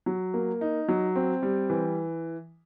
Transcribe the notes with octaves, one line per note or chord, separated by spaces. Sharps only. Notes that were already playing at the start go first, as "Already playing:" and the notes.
F#3
A#3
D#4
F#3
C4
G3
E3